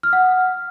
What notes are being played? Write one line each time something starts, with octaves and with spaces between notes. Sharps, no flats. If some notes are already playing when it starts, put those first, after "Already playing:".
F#5 D#6 F6